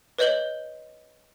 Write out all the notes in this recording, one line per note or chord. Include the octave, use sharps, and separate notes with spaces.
B4 C#5 D#5 G6 F#7 G7